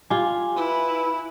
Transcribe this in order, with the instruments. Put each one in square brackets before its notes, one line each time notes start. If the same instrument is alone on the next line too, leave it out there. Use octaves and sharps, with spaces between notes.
[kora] F4 G4 [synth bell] G#5
[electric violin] E4 [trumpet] B4